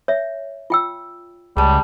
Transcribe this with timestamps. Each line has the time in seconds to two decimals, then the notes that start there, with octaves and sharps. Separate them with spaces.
0.08 C#5 E5
0.70 F4 G5 E6
1.57 C#2 G3 G#4 A5